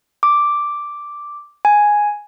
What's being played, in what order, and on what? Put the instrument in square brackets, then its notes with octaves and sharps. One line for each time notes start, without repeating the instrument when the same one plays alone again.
[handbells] D6
G#5